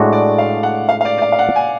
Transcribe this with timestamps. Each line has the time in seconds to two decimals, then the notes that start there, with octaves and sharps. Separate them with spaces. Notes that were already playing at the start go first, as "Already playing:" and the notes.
Already playing: A2 G#3 D4 F#4
0.12 D5
0.38 F5
0.63 F#5
0.89 F5
1.01 F5
1.05 D5
1.18 D5
1.22 F5
1.32 F5
1.39 F#5
1.56 G#5